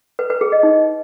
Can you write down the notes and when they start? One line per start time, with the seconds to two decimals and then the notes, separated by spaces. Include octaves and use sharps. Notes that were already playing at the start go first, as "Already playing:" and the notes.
0.19 B4
0.30 B4
0.41 G#4
0.52 D#5
0.63 D#4